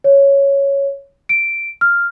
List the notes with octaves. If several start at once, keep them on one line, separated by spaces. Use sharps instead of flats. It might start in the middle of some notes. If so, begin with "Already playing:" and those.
C#5
D7
F6